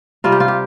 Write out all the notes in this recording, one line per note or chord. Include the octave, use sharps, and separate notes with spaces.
C3 G3 F4
G4
F4
G4